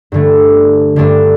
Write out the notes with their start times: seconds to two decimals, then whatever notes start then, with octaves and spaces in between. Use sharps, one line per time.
0.12 G2 D3 A3 D4
0.96 G2 D3 A3 D4